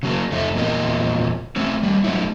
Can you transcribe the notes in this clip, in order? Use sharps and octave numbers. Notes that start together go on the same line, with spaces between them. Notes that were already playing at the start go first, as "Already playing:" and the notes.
C#3 F#3 A#3
F2 A3 D#4
E2 A#2 F3 A#3 A#4 D#5
A3 C4 C#4
G3 A#3
F#3 A3 A#3 C#4 D#4 E4